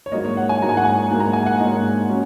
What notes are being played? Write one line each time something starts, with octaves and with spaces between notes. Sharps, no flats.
C#5
G#2 F#3 A#3 D#5
C#5
F#5
G#5
G#2 F#3 A#3 A#5
G#5
F#5
G#5
G#2 F#3 A#3
A#5
G#5
F#5
G#2 F#3 A#3 D#5
F#3 C#4